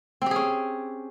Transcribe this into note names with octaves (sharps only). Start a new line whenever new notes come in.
C4 C#4 G4 G#4